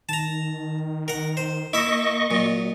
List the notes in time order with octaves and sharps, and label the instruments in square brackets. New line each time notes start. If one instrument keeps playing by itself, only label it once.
[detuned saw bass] D#3 [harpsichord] A5 A#5
[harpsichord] A#4 F#5
C5
[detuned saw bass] A#3 [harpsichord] E4 E5 [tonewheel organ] D#5 C#6
[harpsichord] A#2 [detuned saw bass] F#3